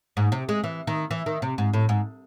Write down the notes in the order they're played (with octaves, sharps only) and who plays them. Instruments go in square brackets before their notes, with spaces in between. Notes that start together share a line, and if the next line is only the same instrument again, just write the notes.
[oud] G#2
C3
G#3
E3
D#3
E3
D#3
C3
G#2
A2
G#2